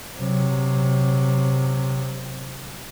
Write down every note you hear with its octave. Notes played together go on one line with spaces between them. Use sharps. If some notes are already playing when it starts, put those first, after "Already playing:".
C3 F#3